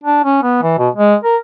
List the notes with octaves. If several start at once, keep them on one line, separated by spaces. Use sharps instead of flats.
D4
C#4
B3
E3
B2
G#3
A#4